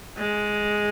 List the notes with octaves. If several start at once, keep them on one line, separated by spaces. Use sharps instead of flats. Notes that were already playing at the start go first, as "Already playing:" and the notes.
G#3